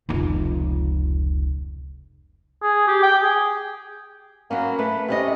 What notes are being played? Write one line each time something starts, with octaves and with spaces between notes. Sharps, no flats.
F1 C#2
G#4
G4
G5
G#4
F#3 A#3 B3 C#4
A3 B4
C3 G3 C#4 D#5